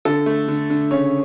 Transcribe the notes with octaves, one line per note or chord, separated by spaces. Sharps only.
D3 A4
A3
D3
D3
C#3 C#5